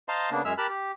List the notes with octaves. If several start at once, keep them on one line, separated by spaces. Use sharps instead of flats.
C5 D#5 F5 A5 A#5 C6
C#3 A#3 B3 D4
F#2 G#3 G#4 E5 E6 F6
G4 A#4 A5 B5 F6 F#6
G4